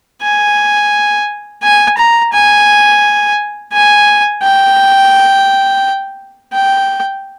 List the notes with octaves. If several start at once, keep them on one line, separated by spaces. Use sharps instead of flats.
G#5
G#5
A#5
G#5
G#5
G5
G5